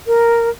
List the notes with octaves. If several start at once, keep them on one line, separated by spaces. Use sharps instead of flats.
A#4